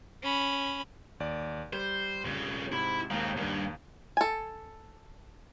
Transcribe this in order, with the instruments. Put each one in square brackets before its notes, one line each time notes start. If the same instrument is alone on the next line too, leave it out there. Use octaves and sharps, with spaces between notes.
[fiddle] C#4 B5
[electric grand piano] D#2 D5
[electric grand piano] G3 [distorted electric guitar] C5
[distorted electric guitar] F2 C#3
[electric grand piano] G#2 C3 [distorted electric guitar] E4 B5
[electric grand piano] D#2 F5 A#5 [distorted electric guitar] G#3 C4
[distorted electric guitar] D2 G2
[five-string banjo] A4 G#5